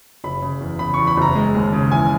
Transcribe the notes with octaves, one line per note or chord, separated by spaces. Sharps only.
F#1 B5
C#3
E2
C#3 B5
E2 C#6
B5
F#1 A#5
G#3
D#2
C#3
E3 G#5